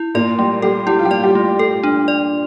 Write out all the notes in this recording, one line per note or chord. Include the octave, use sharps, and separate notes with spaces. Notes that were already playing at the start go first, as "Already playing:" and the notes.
Already playing: E4
A#2 A#3 D5
G3 A3 G4
G3 G4 A4
G3 E4 G4
F4
G3 G4
D5
G3 G4
A3
A4
D4
D5